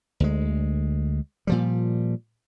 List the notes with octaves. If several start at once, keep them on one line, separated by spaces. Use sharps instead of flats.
D2 G#3
A#2 F3 G3